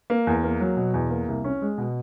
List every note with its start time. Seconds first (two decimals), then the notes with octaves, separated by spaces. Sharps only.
0.10 A#3
0.27 E2
0.43 A#3
0.61 F#3
0.77 B2
0.94 E2
1.10 A#3
1.28 C2
1.44 C#4
1.62 G#3
1.78 B2